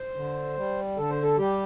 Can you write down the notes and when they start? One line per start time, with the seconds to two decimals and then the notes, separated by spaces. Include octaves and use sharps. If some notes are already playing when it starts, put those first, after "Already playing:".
Already playing: C5
0.16 D3
0.57 G3
0.97 D3 A4
1.10 C5
1.23 A4
1.38 G3 G4